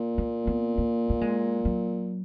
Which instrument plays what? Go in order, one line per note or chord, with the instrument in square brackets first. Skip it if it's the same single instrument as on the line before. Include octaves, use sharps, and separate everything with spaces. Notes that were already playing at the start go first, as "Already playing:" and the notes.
Already playing: [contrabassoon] A#2
[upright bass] A#3
B3
A#3
A#3
G#3
F#3